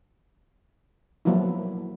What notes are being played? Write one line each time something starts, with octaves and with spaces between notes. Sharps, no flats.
F3 F#3 A#3 B3 E4